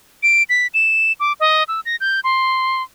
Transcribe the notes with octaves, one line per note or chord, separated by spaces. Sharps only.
D7
B6
E7
D6
D#5
E6
A#6
G6
C6